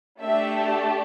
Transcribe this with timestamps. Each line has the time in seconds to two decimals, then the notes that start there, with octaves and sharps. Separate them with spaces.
0.20 A3 D4 G4 E5